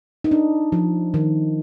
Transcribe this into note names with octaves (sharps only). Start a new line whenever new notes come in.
D#4
D4
F3
D#3